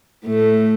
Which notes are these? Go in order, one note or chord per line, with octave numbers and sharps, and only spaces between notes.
A2 A3